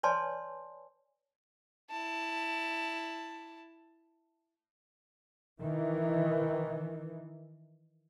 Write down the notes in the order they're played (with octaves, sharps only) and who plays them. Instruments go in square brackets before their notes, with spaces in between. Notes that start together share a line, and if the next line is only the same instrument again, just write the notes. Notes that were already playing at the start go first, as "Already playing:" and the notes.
[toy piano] B4 C#5 D5 G#5 A5 C6
[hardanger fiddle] E4 A5
[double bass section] D#3 E3